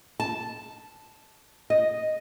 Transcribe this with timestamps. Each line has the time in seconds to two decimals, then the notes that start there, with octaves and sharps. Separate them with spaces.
0.20 A5
1.70 D#5